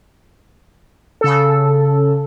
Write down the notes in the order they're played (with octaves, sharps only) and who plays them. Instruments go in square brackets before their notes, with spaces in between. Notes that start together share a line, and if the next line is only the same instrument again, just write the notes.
[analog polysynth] C#3 A4